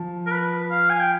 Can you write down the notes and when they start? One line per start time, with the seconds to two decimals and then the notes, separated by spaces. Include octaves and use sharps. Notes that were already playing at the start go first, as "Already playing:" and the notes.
Already playing: F3
0.26 A#4
0.31 B4
0.71 F5
0.90 G#5
1.00 G5